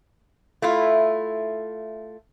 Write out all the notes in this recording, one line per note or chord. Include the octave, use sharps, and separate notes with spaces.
A3 E4 F4